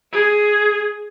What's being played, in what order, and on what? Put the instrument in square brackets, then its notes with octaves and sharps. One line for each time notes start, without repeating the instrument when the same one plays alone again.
[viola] G#4